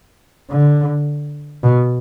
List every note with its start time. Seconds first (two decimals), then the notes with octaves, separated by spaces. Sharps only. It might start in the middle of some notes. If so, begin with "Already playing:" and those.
0.50 D3
1.63 B2